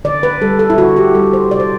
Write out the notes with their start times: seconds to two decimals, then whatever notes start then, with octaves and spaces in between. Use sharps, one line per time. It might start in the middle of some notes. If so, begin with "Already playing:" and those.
0.05 D3 D5
0.23 B4
0.41 G3 A4
0.59 A4
0.70 E4
0.78 D3 F#4
0.96 G4
1.15 G3 A4
1.33 C5
1.51 C3 D5
1.60 C5